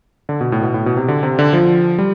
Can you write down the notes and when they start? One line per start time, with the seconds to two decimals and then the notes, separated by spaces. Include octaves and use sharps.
0.29 D3
0.41 B2
0.52 A2
0.62 B2
0.74 A2
0.86 B2
0.97 C3
1.08 D3
1.23 C3
1.39 D3
1.53 F3
1.98 G3